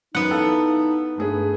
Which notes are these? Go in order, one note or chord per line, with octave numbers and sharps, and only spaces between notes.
F#2 B3 D#4 F#5
E4 A4 F5
G2 A3 G#4 B4